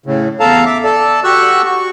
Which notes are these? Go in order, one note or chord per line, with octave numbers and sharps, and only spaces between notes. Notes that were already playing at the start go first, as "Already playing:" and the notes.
A2 C#3
E2 A4 F5 A5 A#5
E5 D6
A4 D5 A5
F#4 G4 C#6 E6 F#6
F#4 C#6